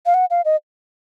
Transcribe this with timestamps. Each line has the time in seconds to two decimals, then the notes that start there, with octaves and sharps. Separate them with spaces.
0.06 F5
0.14 F#5
0.30 F5
0.45 D#5